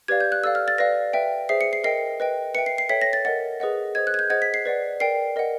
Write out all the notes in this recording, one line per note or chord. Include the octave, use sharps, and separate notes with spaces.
G4 B4 D5 F5 G#6
G6
F#6
A4 D5 F5 E6
F6
A6
B4 D5 F5 A#6
B4 E5 G5
G#4 C5 E5 C7
C#7
C7
A#4 D#5 G5 C7
B4 D#5 G5
B4 E5 G5 C#7
C7
C7
A4 C#5 E5 G5 B6
A#6
A6
A#4 D#5 F#5 A6
G#4 B4 D#5 F#5
G#4 C5 D#5 G#6
F#6
G#6
G6
G#4 C5 D#5 F#5 G#6
B6
C7
B4 D5 F#5
A#4 D5 G5 C7
A#4 D#5 F#5